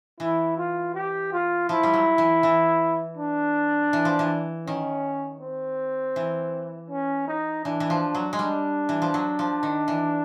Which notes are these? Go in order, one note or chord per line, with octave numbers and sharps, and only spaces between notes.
E3 E4
F4
G4
F4
F3 E4
G3
F#3
E3
E3
D4
E3
F3
E3
D#3 C#4
C4
E3
C#4
D#4
E3 D4
E3
F3
F#3
G#3
G3 D4
E3
F3
F#3
F3
D#3
E3